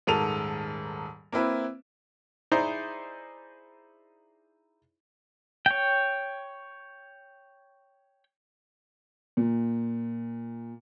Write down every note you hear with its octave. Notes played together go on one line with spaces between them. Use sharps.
D#1 G#2 A4 A#4 D#7 F7
A#3 C4 E4 B4
D#4 E4 G#4 C5 D5 A#5
C#5 G5
A#2